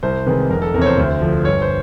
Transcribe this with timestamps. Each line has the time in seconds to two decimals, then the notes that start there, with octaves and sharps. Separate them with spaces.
0.03 C2 C5
0.26 C3 D#3 G#3 B4
0.50 F1 A#4
0.62 A4
0.74 E2 A#4
0.78 C3 C#5
0.86 C5
0.98 D2
1.22 D3 F3
1.45 G1 C#5
1.62 C5